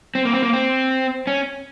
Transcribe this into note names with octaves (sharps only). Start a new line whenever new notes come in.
C4
A#3
C4
A#3
C4
C#4